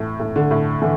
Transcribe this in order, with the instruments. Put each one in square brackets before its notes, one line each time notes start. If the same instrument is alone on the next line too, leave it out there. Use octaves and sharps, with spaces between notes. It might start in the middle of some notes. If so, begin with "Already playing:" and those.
Already playing: [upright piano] A2 E3
A2
[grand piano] D3
[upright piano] A2
[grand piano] D3 [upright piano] E3